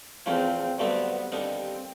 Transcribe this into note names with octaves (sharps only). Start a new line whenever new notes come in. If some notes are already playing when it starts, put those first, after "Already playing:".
E2 C#3 F3 A3 C4 C#4
G2 D3 F#3 A3 B3 C4
D#2 D3 G3 B3 C4 D#4